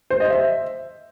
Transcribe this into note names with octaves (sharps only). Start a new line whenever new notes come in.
C5
D#5
E5